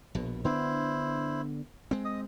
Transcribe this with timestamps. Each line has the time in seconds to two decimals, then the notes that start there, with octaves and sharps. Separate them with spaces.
0.15 A#1 B2
0.45 D3 B3 D4 E4 C5
1.91 G#3 C4
2.05 D#5 D#6